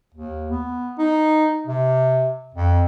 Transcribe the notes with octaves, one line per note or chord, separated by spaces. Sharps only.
D#2
B3
D#4
C3
F2